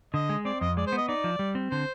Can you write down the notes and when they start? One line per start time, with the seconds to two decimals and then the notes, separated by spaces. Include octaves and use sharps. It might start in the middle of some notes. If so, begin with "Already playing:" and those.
0.14 D3 D#5
0.29 G#3
0.45 C4 D5
0.61 F2 D#5
0.77 G#3 D5
0.87 C5
0.92 B3
0.98 D#5
1.08 D#4 D5
1.24 F3
1.39 G3
1.55 C4
1.71 D3 C5